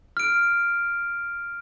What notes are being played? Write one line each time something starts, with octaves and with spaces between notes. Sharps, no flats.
F6 D7